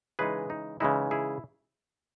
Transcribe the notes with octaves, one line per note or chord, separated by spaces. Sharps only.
C#3 E3 G#3 D#4 G#4 B4
D#4
C#3 E3 G#3 D#4 E4
E4 G#4